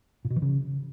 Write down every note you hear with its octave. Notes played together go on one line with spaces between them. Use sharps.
A#2
B2
E3
C#3